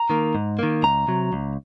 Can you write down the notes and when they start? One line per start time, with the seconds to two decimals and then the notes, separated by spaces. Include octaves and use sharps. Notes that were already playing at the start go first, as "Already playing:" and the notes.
Already playing: A#5
0.10 D#3 A#3
0.35 G#2
0.59 D#3 A#3
0.83 C#2 A#5
1.08 C3 F#3
1.33 C#2